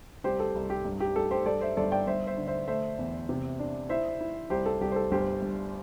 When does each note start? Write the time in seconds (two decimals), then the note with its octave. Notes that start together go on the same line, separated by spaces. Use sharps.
0.24 C2 G4 C5
0.40 A4
0.55 C2
0.70 G4
0.85 G2
1.00 G4
1.15 G3 A4
1.31 G4 C5
1.46 G2 A4 D5
1.61 C5 E5
1.77 G1 A4 D5
1.92 D5 G5
2.07 G1 C5 E5
2.27 C5 E5
2.37 D3
2.47 C5 E5
2.68 A3 C5 E5
2.98 E2
3.29 C3
3.59 D4
3.89 E4 C5 E5
4.21 E4
4.50 C2 G4 C5
4.66 A4
4.81 C2 G4
4.92 C5
4.96 A4
5.11 G1 G4 C5
5.42 G2